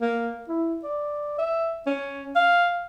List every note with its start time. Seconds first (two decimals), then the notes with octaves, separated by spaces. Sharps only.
0.01 A#3
0.48 E4
0.83 D5
1.38 E5
1.87 C#4
2.35 F5